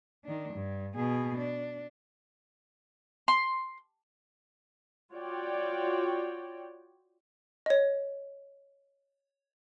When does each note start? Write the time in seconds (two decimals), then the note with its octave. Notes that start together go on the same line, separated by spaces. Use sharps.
0.25 D#3 D4
0.53 G2
0.96 B2 G#4
1.38 D4
3.28 C6
5.13 F4 F#4 C#5 D5 G5
7.66 C#5 D#5